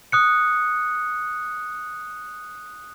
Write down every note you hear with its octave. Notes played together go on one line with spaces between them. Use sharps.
D#6 F#6 C#7